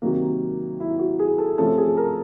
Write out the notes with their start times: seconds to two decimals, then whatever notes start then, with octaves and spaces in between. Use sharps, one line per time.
0.02 C3 D#3 F#3 A#3
0.80 E4
0.99 F#4
1.19 G#4
1.38 A4
1.58 C3 F3 A3 C#4 A4
1.78 G#4
1.97 A#4